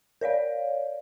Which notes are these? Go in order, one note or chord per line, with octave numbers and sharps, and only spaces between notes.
A#4 C#5 D5 F5